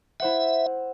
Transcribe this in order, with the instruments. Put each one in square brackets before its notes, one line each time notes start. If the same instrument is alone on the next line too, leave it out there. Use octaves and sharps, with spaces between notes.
[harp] E4 C5 F#5 [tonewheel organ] E5